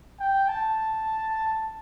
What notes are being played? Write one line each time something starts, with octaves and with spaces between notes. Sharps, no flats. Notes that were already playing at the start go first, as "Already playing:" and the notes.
G5
A5